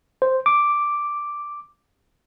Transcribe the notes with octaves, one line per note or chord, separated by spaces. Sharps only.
C5
D6